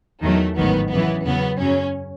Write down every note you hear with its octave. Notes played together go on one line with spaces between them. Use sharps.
E2 D#3 F#3 A3
A1 G#2 D#3 F#3 B3
F#2 C#3 E3 B3
E2 C#3 F#3 B3
F#2 C#3 F#3 C#4